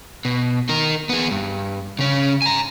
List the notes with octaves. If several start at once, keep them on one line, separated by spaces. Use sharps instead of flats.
B2
D#4 A#4
B3 G#4
G2
C#3 C#4
G#5 A#5